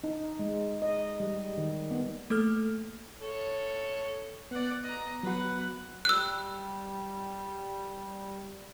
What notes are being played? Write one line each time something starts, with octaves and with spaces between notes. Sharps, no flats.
D#4
G#3
D#5
G3
D#3
B3
A3 A#3 A4 F6
A4 C#5
B3 D5 F#5
D#5 A#5
F#3 F#4 B4 F#5
G3 E6 F#6